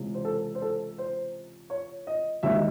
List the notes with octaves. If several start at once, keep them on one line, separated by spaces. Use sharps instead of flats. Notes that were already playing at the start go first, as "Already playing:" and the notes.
Already playing: C#2 C3 E3
C5
A4
C5
A4
C5
C#5
D#5
E1 D#2 D#3 E5
D#5